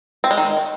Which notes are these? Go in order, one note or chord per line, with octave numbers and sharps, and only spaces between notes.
C4
G#3
D#3